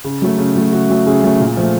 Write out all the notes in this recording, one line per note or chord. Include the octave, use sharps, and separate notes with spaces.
C#3
F#3 A3
C#3
F#3 A3
C#3 F#4
F#3 A3
C#3 G#4
F#3 A3
A#2
F3 A3